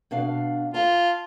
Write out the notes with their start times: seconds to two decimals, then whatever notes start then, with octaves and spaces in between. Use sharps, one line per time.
0.11 B2 D4 F5
0.74 F4 A5